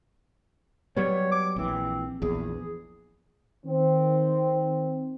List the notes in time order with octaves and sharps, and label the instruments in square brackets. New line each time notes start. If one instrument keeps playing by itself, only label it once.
[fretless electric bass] F#3 G3 B3 [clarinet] C#5
[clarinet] D6
[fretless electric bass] A#1 E3 [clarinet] C4
[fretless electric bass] A#1 E2 [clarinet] G#4
[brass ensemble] D#3 C4